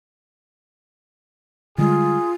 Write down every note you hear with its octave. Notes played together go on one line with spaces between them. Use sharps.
D3 G3 G#3 F4 G#4